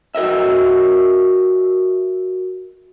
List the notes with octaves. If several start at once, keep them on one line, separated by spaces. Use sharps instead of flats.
F#4 A#4 D#5 E5